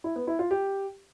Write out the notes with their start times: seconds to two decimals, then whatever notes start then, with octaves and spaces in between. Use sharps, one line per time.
0.04 E4
0.16 B3
0.27 E4
0.39 F4
0.51 G4